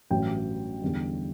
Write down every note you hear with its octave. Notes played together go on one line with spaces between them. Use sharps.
A1 G2 F#3 G5
E2 D3 G3